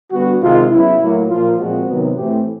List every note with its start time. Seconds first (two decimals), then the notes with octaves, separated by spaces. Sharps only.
0.12 D3 G3 B3 F#4
0.41 C3 D#3 G#3 F4
0.70 C#3 F#3 B3 E4
1.00 A2 F#3 A#3
1.29 A#2 F3 A#3 F4
1.58 A#2 F3 G#3 C4 F#4
1.88 C3 D#3 F#3 B3
2.17 A2 E3 A3 C4 G4